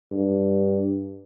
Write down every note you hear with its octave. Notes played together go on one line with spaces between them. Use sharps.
G2